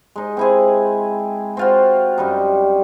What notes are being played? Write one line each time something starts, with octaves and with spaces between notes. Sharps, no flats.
G#3 D#4
C4 E4 G#4
C4 F4 F#4
F#2 G3 D#4